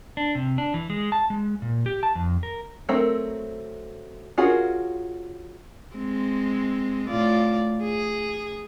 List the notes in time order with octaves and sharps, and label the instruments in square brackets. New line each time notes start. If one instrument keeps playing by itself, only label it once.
[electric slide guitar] D4
C3
D4
E3
G#3
A5
G#3
A#2
G4
A5
F2
A#4
[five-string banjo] F#3 A3 C4 A#4 A#5
C#4 F4 F#4 G#4 A#4
[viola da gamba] G#3 C4
A2 F4 D5
G#4